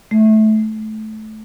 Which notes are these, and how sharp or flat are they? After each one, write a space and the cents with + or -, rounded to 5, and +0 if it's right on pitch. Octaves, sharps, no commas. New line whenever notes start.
A3 -20